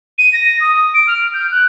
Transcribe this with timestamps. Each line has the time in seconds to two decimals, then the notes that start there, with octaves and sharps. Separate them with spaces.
0.18 D#7
0.33 A#6
0.61 D#6
0.94 D7
1.07 F6
1.34 G6
1.51 F#6